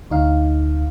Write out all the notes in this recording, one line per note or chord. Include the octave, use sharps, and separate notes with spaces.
D2 D#4 F5